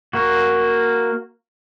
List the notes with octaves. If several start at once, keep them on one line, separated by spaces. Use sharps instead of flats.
A#3 F#4